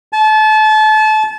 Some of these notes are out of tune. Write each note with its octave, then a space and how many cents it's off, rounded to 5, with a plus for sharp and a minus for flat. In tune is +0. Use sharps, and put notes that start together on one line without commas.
A5 -30